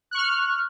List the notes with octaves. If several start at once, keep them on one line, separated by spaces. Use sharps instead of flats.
C#6 F6 F#6